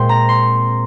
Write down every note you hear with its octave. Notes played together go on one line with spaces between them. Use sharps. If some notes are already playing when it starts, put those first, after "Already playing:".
Already playing: A#2 G#3 C4 G5 C6
A#5
C6